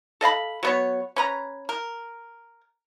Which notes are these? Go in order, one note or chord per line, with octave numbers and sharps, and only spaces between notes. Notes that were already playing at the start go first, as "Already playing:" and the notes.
A4 D#5 F5 B5
F#3 B3 C#5
C#4 B4 A#5
A#4